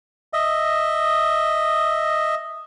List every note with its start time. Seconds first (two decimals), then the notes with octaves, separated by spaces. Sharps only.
0.33 D#5 E5